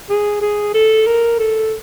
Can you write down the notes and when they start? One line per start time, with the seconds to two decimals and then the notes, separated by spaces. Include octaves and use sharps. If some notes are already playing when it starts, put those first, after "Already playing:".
0.09 G#4
0.42 G#4
0.74 A4
1.07 A#4
1.39 A4